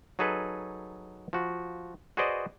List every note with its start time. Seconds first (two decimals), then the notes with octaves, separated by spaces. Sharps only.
0.19 F#3 D#4 G#4 A4 B4
1.33 F3 F#4
2.17 F#4 G#4 B4 C5 D5 D#5